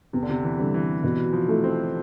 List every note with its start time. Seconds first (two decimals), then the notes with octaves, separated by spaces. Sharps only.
0.13 E2 C3
0.23 D3
0.30 C3
0.43 E3
0.58 D3 G3
0.74 E3
1.03 B2 E3
1.33 F3
1.48 A3 E4
1.64 C4